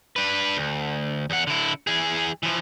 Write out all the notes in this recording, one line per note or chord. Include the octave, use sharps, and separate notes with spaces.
D4 B4
D2
E2 F#5
D3 E4
E3 G#4
E3 F3